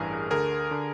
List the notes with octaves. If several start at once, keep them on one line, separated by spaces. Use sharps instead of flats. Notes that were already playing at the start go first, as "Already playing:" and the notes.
Already playing: A1 G2 E3 G#4 A#4
D2 D3 G#4 A#4
D3